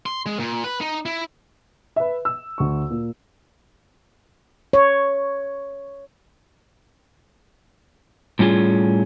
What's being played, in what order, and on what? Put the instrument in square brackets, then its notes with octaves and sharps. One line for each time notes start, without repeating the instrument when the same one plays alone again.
[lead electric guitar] C6
G#3
A#2
B4
D#4
E4
[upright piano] B4 E5
E6
D2 C#6
A#2
[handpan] C#5
[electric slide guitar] A2 G3 C#4 F4 G#4